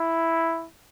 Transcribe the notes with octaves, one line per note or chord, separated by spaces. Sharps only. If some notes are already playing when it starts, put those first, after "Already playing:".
Already playing: E4